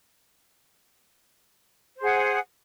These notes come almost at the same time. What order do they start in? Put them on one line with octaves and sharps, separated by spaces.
C5 G#4 F#5